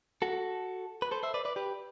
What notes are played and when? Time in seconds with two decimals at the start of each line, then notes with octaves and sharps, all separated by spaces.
0.22 F#4 A4
1.02 B4
1.11 A4 C5
1.23 C5 E5
1.34 B4 D5
1.45 B4 D5
1.56 G4 B4